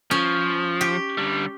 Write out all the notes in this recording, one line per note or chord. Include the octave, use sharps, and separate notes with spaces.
F3 C#4
G4
D3 G3